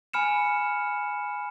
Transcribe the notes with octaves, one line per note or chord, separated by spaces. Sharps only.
G#5 B5 F6 C#7 E7